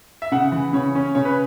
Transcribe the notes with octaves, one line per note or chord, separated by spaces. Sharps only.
E5
C#3 F#5
E3
C#3 C#5
C#4
C#3 C#5
B4